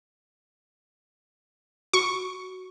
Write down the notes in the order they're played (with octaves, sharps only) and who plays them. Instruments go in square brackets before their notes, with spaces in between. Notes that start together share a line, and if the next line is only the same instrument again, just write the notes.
[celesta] F#4 [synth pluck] C#6